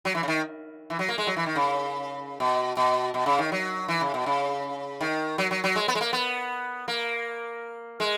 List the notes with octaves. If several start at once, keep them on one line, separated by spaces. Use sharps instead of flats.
F#3
E3
C#3
D#3
E3
F#3
A#3
G#3
F#3
E3
D#3
C#3
B2
B2
B2
C#3
D#3
F#3
E3
C#3
B2
C#3
D#3
F#3
F#3
F#3
G#3
B3
G#3
A#3
B3
A#3
G#3